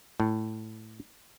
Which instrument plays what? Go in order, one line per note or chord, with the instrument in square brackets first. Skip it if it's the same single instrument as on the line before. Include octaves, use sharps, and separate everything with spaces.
[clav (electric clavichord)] A2